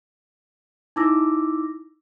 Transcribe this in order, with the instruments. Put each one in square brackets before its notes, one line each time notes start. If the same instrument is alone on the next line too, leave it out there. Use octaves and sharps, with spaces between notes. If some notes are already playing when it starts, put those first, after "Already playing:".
[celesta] D#4 E4 D6 E6 A#6